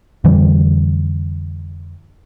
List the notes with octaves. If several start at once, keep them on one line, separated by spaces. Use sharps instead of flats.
F2 D3 E3 G3